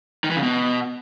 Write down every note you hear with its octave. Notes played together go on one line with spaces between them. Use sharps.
D#3
E3
C#3
B2